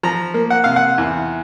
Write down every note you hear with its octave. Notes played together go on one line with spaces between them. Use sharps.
F3 A#5
A#3
F#5
C3 F5
F#5
E2